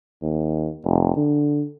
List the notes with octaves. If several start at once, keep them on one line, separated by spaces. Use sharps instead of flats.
D#2
F1
D3